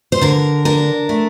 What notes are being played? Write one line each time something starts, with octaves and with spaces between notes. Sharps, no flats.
C5
D3 A#4
D4 A#4
A3